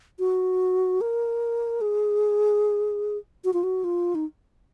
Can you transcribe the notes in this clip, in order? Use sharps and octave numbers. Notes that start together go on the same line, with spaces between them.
F#4
A#4
G#4
F#4
F4
F#4
F4
D#4